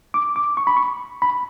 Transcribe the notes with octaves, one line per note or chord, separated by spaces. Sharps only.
D6
D6
C#6
B5
C#6
B5